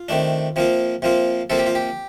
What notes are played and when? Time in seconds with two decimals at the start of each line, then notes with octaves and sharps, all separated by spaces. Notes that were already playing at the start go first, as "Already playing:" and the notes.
Already playing: F4
0.09 C3 D#3 A3 D4
0.56 C3 F3 A#3 F4
1.02 C3 F3 A#3 F4
1.50 C3 F3 A#3 F4 A4
1.59 G4
1.67 F4
1.75 G4